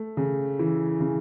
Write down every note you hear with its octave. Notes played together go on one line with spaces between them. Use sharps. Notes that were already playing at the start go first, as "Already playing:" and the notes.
Already playing: A3
C#3
E3
C#3